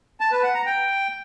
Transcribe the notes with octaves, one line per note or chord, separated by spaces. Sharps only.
A5
B4
F#5
A#5
G5